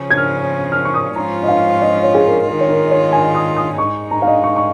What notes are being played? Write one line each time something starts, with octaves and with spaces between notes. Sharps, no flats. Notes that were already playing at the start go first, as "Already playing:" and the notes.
Already playing: C#3 F3 C#4
G#6
F6
F6
C#6
D#6
G#2 F3 C#4 F4 A#5
D#5
F5
D#5
C#5
G#4
A#4
D#3 G#3 F4 A#4
C#5
A#4
C#5
G#5
D#6
D#6
G#2 G#3 D#4 C#6
A#5
F5
D#5
C#6
C#6